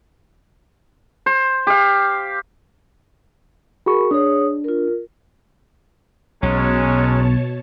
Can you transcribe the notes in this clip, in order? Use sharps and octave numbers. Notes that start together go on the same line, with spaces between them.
C5
G4 F5
F#4 G#4 A#4 B5 C#6
D4 G#4 C#5 D#6
F4 A#4
B1 B2 F#3 G#3 C#4 C#5 A5